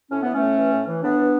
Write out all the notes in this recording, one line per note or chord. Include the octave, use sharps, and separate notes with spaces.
A2 C#4
E3 B3
A3 C#4
A2
E3
A2
E3
A2 B3 D4
E3